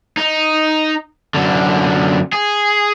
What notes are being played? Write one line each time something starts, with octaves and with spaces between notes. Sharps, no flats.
D#4
F#2 D3
G#4